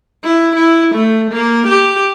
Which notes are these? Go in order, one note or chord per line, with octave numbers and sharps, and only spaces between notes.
E4
E4
A3
A#3
G4